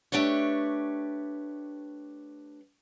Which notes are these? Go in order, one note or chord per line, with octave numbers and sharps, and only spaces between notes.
A3 D4 G4 B4 C#5